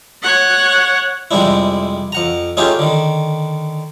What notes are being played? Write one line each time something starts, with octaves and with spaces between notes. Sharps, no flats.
C#5 F#5
F2 C3 G3 G#3 D4 E4
F2 F#5 A#5
A3 C#4 D#4 F4 G4 G#4
D3 D#3